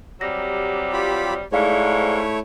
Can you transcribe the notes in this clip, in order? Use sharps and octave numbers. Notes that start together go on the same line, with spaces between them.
C3 F#3 G3 A#6
F4 G4 B5
G#2 A3 E4 G#4 C#5 D5 F5